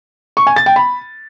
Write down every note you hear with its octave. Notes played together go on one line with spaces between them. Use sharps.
C#6
G#5
A6
G5
B5